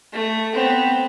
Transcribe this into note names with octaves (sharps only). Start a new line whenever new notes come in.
A3
B3 C4